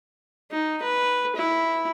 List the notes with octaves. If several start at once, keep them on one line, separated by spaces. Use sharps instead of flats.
D#4
B4
E4